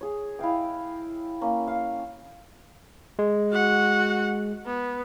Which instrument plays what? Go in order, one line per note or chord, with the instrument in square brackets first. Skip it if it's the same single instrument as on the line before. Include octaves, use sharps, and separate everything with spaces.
[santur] G#4 C#5
E4 D#5 F5 G5
A#3 C#4
F5
[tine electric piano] G#3
[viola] F#4 F#5
B3